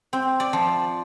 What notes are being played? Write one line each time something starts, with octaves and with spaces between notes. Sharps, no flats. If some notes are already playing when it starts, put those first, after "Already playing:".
C4
D5
F3